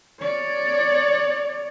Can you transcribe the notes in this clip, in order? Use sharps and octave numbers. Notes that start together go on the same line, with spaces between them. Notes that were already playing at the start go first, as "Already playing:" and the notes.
C#5 D5